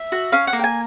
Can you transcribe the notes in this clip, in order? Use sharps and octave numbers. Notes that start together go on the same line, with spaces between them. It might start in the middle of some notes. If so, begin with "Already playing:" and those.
Already playing: E5
F#4
C#4 F5
F#5
A#3
G5
G#5